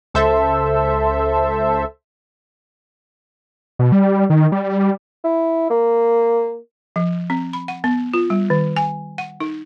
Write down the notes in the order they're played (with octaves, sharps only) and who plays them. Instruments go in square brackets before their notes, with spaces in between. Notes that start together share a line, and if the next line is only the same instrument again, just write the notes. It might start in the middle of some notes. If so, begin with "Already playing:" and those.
[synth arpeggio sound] C#2 A4 C5 E5
[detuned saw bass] B2
G3
D#3
G3
[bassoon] E4
A#3
[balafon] F3
C4
B5
F#5
B3
F4
G3
D#3
G#5
F#5
D#4